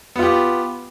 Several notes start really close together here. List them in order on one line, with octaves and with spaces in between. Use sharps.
B3 F4 G4